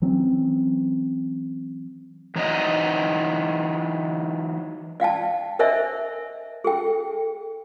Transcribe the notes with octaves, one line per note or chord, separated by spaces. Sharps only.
E3 F#3 C4 C#4
E3 F#3 D#4 C5 D#5
D5 F5 G5 A5
A#4 C5 C#5 D#5 E5 G#5
G#4 A4 G5